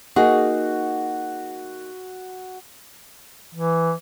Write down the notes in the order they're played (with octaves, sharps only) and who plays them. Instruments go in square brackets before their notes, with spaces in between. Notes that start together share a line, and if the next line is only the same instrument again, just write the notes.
[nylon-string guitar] A#3 D#4 G#4 [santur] F#4
[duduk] E3